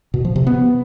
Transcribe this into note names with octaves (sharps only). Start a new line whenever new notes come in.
B2
F3
C3
B3